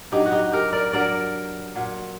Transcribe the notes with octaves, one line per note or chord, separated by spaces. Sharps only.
G2 F#3 D#4 G4
F#4
D#4 G4
G4 A#4
A#4 D5
G2 F#3 A#4 D5
A#2 F#3